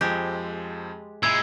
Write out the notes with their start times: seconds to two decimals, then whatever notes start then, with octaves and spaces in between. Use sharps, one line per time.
0.01 F2 F3 G#3 C4 G4
1.23 A#2 G#3 E4 E6 G#6